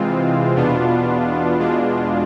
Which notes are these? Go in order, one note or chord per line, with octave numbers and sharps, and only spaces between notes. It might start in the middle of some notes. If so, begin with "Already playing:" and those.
Already playing: C3 E3 G#3 C4 F4
E2 B2 B3 D4 F4
E2 B2 G#3 D4 F4